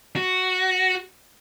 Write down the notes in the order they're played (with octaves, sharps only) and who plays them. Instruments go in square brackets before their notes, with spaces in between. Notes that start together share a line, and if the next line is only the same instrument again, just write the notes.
[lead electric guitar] F#4